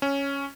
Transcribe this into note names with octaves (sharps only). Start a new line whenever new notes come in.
C#4